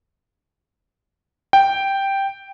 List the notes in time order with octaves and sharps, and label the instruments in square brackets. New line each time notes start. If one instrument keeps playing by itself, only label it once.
[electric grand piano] G5